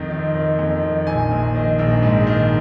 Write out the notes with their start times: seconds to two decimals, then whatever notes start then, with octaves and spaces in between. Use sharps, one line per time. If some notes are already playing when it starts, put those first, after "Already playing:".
Already playing: F2 D#3
0.11 D#3
0.35 D#3
0.59 F2
0.83 D#3
1.07 A#1 G#5
1.31 A#1
1.55 D#3
1.79 A#1
2.02 G#2
2.27 D#3